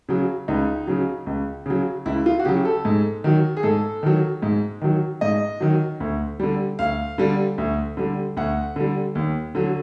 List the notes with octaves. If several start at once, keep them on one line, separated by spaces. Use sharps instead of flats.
C#3 F#3
C#2 D#4
C#3 F#3
C#2
C#3 F#3
C#2 E4
F4
F#4
C#3 F#3 G4
A4
G#2
D#3 F#3
G#4
G#2 A4
D#3 F#3
G#2
D#3 F#3
G#2 D#5
D#3 F#3
D2
D3 G3
D2 F5
D3 G3
D2
D3 G3
D2 F#5
D3 G3
D#2
D3 F#3